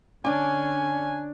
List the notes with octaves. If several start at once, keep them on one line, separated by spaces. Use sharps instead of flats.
D3 C#4 D4 G#5 D6